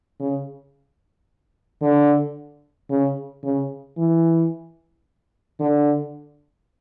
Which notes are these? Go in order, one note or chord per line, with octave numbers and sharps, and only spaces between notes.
C#3
D3
C#3
C#3
E3
D3